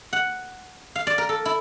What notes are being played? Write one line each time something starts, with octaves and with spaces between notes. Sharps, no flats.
F#5
F5
D5
A#4
A4
E4